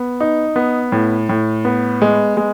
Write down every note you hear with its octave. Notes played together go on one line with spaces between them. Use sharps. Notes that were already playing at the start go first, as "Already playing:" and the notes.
Already playing: B3
D#4
B3
A2
A2
B3
G#3
G#3